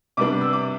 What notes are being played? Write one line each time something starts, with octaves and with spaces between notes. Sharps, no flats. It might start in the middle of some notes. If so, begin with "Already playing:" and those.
C3 G3 B3 D4 D6
E6
D6